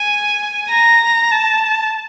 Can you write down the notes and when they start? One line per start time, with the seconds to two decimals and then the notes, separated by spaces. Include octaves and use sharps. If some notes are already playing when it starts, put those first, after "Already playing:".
Already playing: G#5
0.69 A#5
1.31 A5